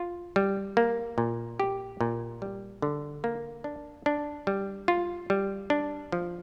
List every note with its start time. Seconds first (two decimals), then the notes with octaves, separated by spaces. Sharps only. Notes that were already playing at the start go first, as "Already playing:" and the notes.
Already playing: F4
0.36 G3
0.77 A#3
1.18 A#2
1.60 G4
2.01 A#2
2.42 G3
2.82 D3
3.24 A#3
3.64 D4
4.06 D4
4.47 G3
4.88 F4
5.30 G3
5.70 D4
6.12 F3